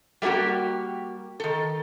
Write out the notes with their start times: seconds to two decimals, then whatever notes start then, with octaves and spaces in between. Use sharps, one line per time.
0.22 G3 A3 A#3 F#4 G4
1.40 D#3 A4